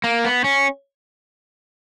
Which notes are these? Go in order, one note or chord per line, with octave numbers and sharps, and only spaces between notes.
A#3
B3
C#4